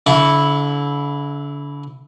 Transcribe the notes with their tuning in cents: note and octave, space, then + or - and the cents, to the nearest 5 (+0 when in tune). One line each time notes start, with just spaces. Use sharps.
D3 -40 E4 -5 C#6 +15